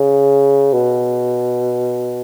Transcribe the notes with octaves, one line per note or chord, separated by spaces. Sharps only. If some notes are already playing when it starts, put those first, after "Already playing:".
Already playing: C#3
B2